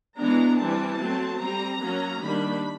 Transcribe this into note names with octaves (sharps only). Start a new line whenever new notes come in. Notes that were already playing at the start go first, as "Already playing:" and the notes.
E3 G#3 B3 D4 A#5
E3 G3 C4 A5
F#3 A3 C4
G3 C4 A#5
F#3 A#3 C#4
D#3 G3 A#3 D4 B5